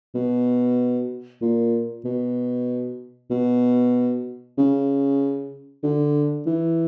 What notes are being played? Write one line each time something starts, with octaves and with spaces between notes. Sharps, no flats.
B2
A#2
B2
B2
C#3
D3
E3